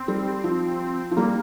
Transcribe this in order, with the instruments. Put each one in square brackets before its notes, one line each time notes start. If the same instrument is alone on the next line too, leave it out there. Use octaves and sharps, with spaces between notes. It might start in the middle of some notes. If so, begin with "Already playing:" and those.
Already playing: [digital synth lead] C4
[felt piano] G3
F3
F3
[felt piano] G3 [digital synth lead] A#3